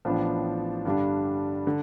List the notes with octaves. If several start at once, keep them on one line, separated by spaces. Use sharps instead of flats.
A1 A2 F3 B3 D4
G2 D3 G3 D4
D3